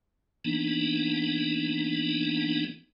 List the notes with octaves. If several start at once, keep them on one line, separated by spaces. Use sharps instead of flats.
E3 A#3 B3 D4 D#4